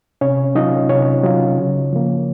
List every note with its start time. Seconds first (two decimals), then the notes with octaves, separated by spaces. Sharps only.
0.21 C3 C#4 C#5
0.55 F#3 C#4 D#4 F4 D#5
0.89 C3 C#4 C#5
1.23 F#3 C#4 F4
1.58 C#3
1.93 F3 A#3